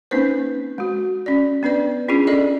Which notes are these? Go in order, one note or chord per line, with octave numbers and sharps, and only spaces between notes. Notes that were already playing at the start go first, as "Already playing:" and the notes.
A#3 C4 C#4 D#4 B4 C5
G#3 F#4
C#4 D5
B3 D4 B4 D5
C#4 D4 E4 F4 G#4
C#4 D4 A4 D5 D#5